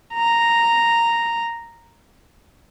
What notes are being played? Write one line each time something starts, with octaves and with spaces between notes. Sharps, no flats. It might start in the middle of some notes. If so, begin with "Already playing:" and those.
A#5